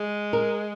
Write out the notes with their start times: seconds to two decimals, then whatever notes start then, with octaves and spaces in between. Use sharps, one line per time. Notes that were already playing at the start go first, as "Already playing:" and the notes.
Already playing: G#3
0.33 A#4